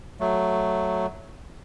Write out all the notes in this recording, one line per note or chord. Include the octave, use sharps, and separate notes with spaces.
F#3 A3